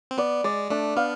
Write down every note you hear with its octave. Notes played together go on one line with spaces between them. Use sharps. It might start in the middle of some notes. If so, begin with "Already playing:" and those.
C4
B3 D5
G#3 D5
A3 D4
B3 F5